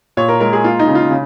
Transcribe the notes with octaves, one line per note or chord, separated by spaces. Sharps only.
A#2 C#5
A#4
G#3 A#4
G#4
A#3 F4
D#4
C#3
F4
C#3